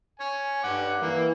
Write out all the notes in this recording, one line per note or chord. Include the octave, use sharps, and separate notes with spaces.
C#5 G#5
G2 F#5 D6
E3 A#3